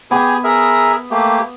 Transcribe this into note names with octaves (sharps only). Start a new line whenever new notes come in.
B3 G4 G#4 G#5
G#4 A#4 E5
A3 A#3 G4